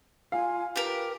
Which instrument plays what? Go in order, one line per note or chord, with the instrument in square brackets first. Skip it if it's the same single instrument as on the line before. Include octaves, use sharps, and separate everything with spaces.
[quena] F4 [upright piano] F5 [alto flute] G#5
[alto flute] F4 [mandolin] G4 A#4 [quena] B4